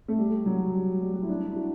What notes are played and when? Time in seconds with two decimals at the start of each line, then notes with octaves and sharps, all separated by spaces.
0.08 A3
0.18 G3
0.46 F#3
0.74 G3
1.01 G3
1.13 F#4
1.22 E4
1.29 D4
1.50 E4
1.56 F#4